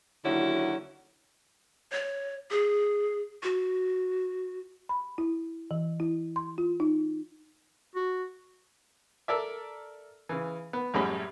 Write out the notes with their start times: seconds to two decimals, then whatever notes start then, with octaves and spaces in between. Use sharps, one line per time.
0.25 D#2 D3 F#3 C#4 E4 F#4
1.92 C#5
2.51 G#4
3.43 F#4
4.89 B5
5.18 E4
5.71 E3
6.00 E4
6.36 C6
6.58 F4
6.80 D#4
7.95 F#4
9.28 A4 A#4 D5 E5
10.29 C#3 E3
10.73 B3
10.94 A1 F#2 G3 G#3 C#4 B5